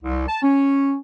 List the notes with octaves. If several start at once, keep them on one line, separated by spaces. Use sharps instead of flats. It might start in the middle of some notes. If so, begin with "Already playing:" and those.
C2
A5
C#4